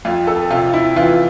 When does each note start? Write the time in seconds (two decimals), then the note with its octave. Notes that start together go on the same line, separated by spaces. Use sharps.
0.05 F2 F4
0.27 A4
0.50 C3 F4
0.73 E4
0.96 E3 F4